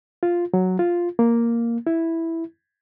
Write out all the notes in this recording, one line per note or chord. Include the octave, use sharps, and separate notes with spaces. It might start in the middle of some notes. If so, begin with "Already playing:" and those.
F4
F#3
F4
A#3
E4